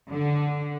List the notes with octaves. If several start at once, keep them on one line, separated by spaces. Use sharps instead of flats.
D3